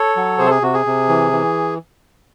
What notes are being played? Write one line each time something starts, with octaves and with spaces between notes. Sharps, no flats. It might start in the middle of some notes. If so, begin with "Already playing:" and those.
Already playing: A4 C#5
F#3
C3 G#4 C5
A4
G#4
C3 F#4
G#4
C3
E3
E3